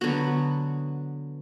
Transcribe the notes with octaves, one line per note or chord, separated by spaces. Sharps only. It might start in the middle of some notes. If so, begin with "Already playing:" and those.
D3 F#3 B3 F#4